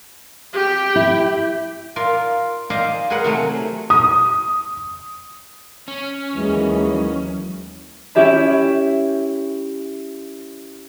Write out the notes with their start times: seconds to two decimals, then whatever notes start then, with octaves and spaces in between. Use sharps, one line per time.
0.53 G4 G5
0.96 E4
1.96 F4 A#4 D5
2.70 C5 D5 D#5 F5 G#5 A#5
3.10 F#4 G#4 A#4 B4 F#5
3.24 C3 F#3 A3 G#4
3.90 D#6
5.88 C#4
6.35 D#2 E3 F#3 G#3
8.15 C#4 E4 G4 E5 B5